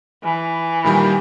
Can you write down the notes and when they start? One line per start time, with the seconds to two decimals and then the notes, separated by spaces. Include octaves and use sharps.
0.24 E3
0.84 A#2 D#3 G3